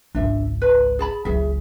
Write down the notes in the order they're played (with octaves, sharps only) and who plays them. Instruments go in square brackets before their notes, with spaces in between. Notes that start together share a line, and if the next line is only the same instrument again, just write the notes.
[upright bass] G#1 C#2 [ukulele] D4 E5
[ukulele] B4
G#4 A5 B5
[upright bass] F#1 C#2 [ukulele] G#4 E5